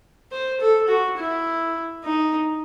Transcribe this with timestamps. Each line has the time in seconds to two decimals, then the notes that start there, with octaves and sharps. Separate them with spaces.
0.32 C5
0.61 A4
0.88 F#4
1.17 E4
2.04 D#4